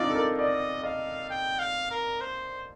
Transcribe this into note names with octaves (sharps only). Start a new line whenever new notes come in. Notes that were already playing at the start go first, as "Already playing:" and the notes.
Already playing: C4 D4 D#4 F4 D5
A4
A#4
D5 D#5
D#5 F5
G5
F5
A#4
C5